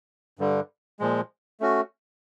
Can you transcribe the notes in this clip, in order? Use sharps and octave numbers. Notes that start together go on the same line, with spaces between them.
G2 D3 G3
A#2 F3 G#3
A3 C#4 F#4